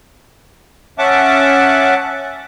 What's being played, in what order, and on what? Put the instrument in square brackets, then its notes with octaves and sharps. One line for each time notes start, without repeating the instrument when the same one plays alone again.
[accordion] C#4 E5 F#5 A5 D6